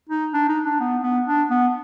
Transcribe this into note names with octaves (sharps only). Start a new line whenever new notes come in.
D#4
D4
D#4
D4
B3
B3
D4
B3